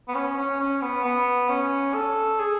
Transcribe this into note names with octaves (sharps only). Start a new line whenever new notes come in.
B3
C#4
C#4
C#4
B3
B3
C#4
A4
G#4